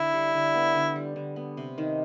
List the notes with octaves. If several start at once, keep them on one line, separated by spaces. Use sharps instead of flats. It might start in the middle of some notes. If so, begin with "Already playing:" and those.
Already playing: D3 E4
G3
D3
B3
D3
G3
D3
B3
C3
D#3